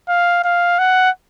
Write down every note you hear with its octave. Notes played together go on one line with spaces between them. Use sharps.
F5
F5
F#5